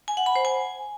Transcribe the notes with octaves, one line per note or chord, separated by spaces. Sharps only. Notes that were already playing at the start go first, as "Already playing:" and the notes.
G#5
F#5
B5
C5
G#5